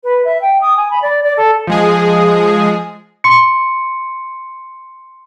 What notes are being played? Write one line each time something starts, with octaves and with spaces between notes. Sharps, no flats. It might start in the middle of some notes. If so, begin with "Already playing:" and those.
B4
E5
G5
D#6
G#5
B5
D5
D5
A4
F3 G#3 G#4
C6 C#7